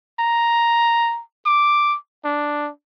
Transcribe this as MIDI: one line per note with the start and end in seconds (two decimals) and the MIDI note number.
0.19 1.21 82
1.46 1.96 86
2.25 2.70 62